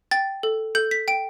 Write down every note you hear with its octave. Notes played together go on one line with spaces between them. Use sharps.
G5 A6
A4
A4 G6
B6
G5 D7